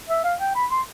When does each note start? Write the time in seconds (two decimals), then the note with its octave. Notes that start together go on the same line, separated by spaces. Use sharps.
0.09 E5
0.24 F5
0.40 G5
0.55 B5
0.71 C6